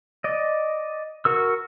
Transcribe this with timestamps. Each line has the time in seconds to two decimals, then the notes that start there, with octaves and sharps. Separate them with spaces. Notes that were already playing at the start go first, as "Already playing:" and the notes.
0.24 D5 D#5
1.25 F#4 A#4 E6